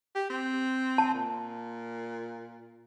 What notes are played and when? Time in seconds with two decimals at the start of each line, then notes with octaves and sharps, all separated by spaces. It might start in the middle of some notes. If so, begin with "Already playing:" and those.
0.16 G4
0.30 C4
0.98 A5
1.14 A#2